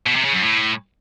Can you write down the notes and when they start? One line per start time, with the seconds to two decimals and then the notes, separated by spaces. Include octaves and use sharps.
0.06 B2
0.15 C3
0.24 C#3
0.33 F#2
0.42 A2